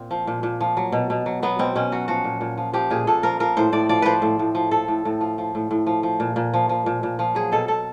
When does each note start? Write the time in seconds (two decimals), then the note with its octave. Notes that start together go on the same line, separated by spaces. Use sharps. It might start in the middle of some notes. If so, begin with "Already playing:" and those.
Already playing: A#2 C4
0.11 F3
0.27 A#2
0.43 A#2
0.61 F3
0.77 F#3
0.92 B2
1.10 B2
1.26 F#3
1.42 F#3 B3
1.59 B2 C4
1.75 B2 C#4
1.92 F#3 F#4
2.08 F3 F#4
2.24 A#2
2.41 A#2
2.57 F3
2.73 F3 G4
2.90 A#2 G#4
3.07 A#2 A4
3.23 F3 A#4
3.40 F3 A#4
3.57 A2 C5
3.72 A2 D5
3.89 F3 D5
4.02 F3 B4 C5
4.22 A2
4.39 A2
4.55 F3
4.71 F3 A4
4.88 A2
5.05 A2
5.21 F3
5.38 F3
5.55 A2
5.71 A2
5.87 F3
6.03 F3
6.20 A#2
6.36 A#2
6.54 F3
6.69 F3
6.86 A#2
7.03 A#2
7.19 F3
7.35 F#3 G#4
7.52 B2 A4
7.68 B2 A4